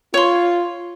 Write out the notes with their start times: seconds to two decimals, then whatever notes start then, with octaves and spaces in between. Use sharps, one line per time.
0.14 F4 C#5 C6